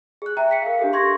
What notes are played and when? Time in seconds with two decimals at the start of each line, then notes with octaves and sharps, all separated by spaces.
0.22 G#4 F#6
0.37 E5 G5 A#5
0.51 B6 C#7
0.62 A#4 F5
0.79 D4 G4 A4
0.93 C6 C#6 G#6 A#6